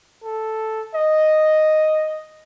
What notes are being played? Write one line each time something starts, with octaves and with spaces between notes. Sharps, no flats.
A4
D#5